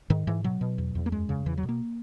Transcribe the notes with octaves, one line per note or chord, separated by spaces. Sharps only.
G#2 D#3
G#2 E3
B2 F#3
B2
E2
E2
A#3
F#2 G#3
C#3
E2 E3
F#3
B2
A#3